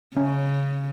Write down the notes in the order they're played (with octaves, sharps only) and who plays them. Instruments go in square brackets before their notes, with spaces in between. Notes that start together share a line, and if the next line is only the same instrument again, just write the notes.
[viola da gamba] C#3 [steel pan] C#4